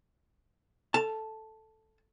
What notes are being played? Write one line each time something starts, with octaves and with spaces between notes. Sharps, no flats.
A4 A5